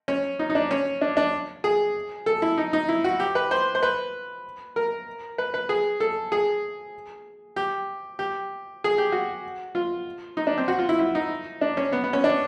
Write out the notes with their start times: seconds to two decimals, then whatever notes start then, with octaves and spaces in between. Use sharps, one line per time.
0.08 C#4
0.39 D#4
0.50 D#4
0.55 D4
0.71 C#4
1.01 D4
1.17 D4
1.64 G#4
2.26 A4
2.42 E4
2.58 D#4
2.73 D#4
2.89 E4
3.04 F#4
3.20 G4
3.35 B4
3.51 C5
3.75 C5
3.83 B4
4.76 A#4
5.38 B4
5.54 B4
5.69 G#4
6.00 A4
6.32 G#4
7.56 G4
8.19 G4
8.84 G#4
8.98 G4
9.12 F#4
9.75 F4
10.37 D#4
10.47 D4
10.58 C4
10.68 F#4
10.79 F4
10.89 E4
10.99 E4
11.15 D#4
11.61 D4
11.77 C#4
11.92 B3
12.04 B3
12.13 C#4
12.24 D4